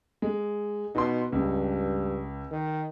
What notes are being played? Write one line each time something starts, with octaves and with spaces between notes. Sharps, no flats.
G#3
B2 D#4 C6
C#2 G2
D#3